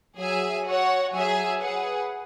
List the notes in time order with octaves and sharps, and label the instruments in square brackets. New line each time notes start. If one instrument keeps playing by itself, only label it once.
[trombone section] F#3 [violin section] G#4 E5 G#5
[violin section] F#4 C#5 F#5
[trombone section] F#3 [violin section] G#4 E5 G#5
[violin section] G#4 B4 F#5